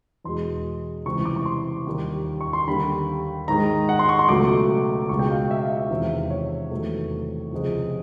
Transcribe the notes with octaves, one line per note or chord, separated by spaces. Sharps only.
E2 B2 G#3 C6
C#2 C3 E3 G3 C#6
D6
C#6
C6
D#2 D#3 G3
C#6
C6
D#2 D3 G3 B5
G#2 D#3 G#3 A#5
F#5
C6
C#6
C6
C#2 B2 F#3 A3 D6
C#2 B2 G#3 C#6
G5
F5
E5
F5
E5
E2 C3 D#3 G#3
C#5
E2 C3 D#3 F#3 A3
C#2 C3 F3 G#3